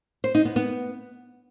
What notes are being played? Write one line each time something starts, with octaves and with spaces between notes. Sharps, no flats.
C5
D#4
B3
B3